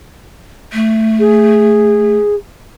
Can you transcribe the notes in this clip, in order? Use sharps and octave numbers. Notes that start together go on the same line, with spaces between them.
A3
G#4